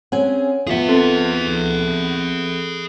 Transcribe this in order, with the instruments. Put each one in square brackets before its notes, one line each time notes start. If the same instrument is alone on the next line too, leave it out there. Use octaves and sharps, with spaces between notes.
[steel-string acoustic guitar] C4 C#4 G#4 [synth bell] F#5 G#5
[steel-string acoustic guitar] B3 F4 [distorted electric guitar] G#4 E5
[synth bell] C4 A4